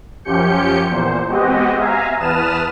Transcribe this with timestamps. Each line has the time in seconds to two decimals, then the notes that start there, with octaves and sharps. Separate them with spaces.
0.25 F#2 F3 C#4 G4 G6 C#7
0.88 E2 A#2 C5
1.28 G#3 B3 C4 F#4 G4 D#5
1.77 E5 F5 G#5 A#5
2.19 E2 B4 A5 D#6 F6 E7